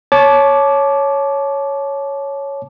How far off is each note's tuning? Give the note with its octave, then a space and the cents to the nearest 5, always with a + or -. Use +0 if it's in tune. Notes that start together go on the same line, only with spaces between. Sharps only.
C#5 +0 A5 -25 D6 +0